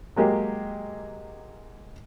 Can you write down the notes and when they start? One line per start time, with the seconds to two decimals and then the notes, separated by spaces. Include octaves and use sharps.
0.16 F#3 G#3 A#3 G4